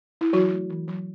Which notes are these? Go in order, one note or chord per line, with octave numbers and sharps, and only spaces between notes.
E4
E3 F#3 F#4
A3
E3
F#3